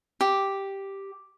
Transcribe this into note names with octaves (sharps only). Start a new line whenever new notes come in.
G4